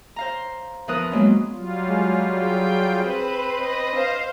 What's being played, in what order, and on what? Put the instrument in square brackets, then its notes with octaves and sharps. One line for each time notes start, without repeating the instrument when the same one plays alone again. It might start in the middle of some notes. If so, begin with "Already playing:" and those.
[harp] C5 F5 A#5
E2 F3 A#4 B4 D#6 F#6
F#3 G#3 A#3 B3 C#4
[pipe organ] F#3 G3 F4
[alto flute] G#3
[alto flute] G#4 [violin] G5
[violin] C4 B4
[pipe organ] D#5
[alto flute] B4 [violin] C5 F5